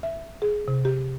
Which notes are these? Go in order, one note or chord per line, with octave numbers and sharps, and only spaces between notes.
E5
G#4
C3
G4